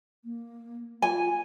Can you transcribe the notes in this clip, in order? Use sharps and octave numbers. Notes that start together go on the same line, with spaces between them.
A#3
F4 G#5